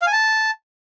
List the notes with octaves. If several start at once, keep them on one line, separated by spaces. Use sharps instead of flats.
F5
G#5
A5